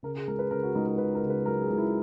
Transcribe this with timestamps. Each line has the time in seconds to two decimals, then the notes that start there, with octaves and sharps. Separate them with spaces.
0.03 C#3 A#4
0.16 G#4
0.27 C#2 A#4
0.39 B4
0.51 C#3 A#4
0.63 F#4
0.75 C#2 D#4
0.86 A#4
0.98 C#3 B4
1.15 A#4
1.23 C#3
1.30 B4
1.46 F#3 A#4
1.62 G#4
1.70 C#2
1.77 E4